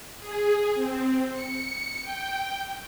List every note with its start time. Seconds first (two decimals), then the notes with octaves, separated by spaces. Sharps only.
0.20 G#4
0.75 C4
1.32 C#7
2.02 G5